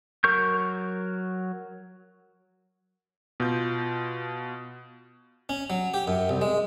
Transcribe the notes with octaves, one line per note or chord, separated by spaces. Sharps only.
F#3 A#4 C#6 G6
B2 F4 G6
C#4
F#3
G4
F#2
C2
G#3